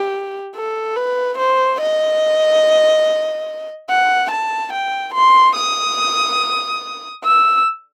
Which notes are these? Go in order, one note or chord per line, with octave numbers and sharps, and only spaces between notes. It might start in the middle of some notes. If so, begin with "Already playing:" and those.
Already playing: G4
A4
B4
C5
D#5
F#5
A5
G5
C6
D#6
E6